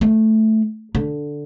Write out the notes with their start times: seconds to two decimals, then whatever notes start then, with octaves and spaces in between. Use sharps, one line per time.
0.01 A3
0.95 D3